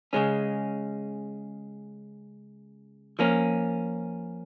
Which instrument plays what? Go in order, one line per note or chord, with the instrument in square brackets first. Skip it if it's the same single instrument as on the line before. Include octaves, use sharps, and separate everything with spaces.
[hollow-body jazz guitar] C#3 G#3 C#4
F3 A#3 C#4